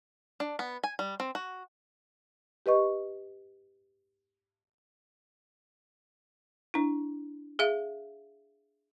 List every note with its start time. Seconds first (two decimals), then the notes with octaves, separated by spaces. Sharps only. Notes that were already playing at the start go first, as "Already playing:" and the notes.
0.40 D4
0.59 B3
0.84 G#5
0.99 G3
1.20 C4
1.35 F#4
2.66 G4 B4 D#5 C#6
6.74 D4 E4
7.59 G#4 E5 F5